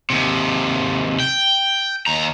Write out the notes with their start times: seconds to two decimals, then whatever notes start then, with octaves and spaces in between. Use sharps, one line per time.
0.10 D#2 C3
1.20 G5
2.07 D#2 A#5